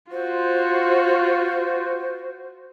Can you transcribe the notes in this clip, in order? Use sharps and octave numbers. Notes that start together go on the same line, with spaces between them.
F4 F#4 C5